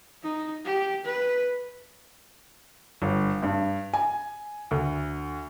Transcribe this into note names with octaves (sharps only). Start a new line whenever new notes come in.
D#4
G4
B4
G1
G2
G#5
D2